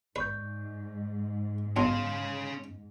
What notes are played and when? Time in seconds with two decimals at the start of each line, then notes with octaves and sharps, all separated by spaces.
0.16 G#2 B4 D5 C#6 G6
1.77 F#2 B2 C#4 F5 C6